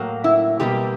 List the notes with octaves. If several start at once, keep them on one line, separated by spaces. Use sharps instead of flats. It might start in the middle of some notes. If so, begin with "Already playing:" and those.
Already playing: A2 F#3 A#3
E4
B2 G3 A#3 G4